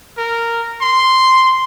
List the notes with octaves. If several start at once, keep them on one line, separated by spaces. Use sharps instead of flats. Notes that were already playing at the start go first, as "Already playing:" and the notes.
A#4
C6